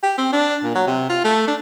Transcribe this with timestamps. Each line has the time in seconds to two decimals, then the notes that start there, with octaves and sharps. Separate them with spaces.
0.03 G4
0.18 C4
0.32 D4
0.63 A#2
0.75 F#3
0.87 C3
1.09 F4
1.24 A3
1.47 D4